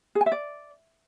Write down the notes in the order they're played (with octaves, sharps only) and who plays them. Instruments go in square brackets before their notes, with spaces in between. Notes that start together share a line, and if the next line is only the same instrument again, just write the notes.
[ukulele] G#4
G#5
E5
D5